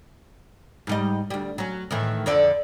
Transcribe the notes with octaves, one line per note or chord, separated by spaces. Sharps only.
G#2 G3 D#5
D2 G3
F#3 C#4
A2 D#3 E3
F2 D3 D5